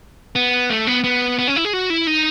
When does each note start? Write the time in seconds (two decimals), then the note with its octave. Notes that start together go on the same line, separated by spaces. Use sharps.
0.36 B3
0.70 A3
0.87 B3
1.04 B3
1.39 B3
1.48 C#4
1.56 E4
1.65 G#4
1.73 F#4
1.90 E4
2.07 D#4